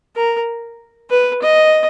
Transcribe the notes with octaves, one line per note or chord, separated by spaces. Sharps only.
A#4
B4
D#5